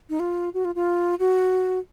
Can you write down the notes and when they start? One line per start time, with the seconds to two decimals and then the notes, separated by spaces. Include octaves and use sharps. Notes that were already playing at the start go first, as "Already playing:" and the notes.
0.10 D#4
0.20 F4
0.54 F#4
0.65 F4
0.75 F4
1.19 F#4